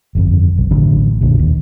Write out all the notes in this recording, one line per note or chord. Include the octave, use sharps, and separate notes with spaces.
G1 F2
B1
A1 D3 D4
F1 B1 A#2 D3
D#2